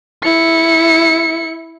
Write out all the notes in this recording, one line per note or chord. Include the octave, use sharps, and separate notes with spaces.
E4 C#7